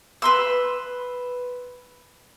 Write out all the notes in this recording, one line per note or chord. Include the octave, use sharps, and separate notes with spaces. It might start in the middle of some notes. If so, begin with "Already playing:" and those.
B4 C6 E6